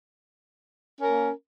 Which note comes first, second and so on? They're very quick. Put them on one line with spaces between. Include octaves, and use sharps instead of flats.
C#4 A#4 A#3